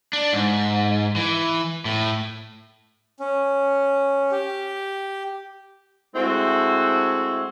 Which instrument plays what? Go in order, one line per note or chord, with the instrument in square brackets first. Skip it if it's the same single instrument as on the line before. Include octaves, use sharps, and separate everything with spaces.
[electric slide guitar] D4
G#2
E3
A2
[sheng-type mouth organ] C#4
G4
[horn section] G#3 A3 C4 E4 F#4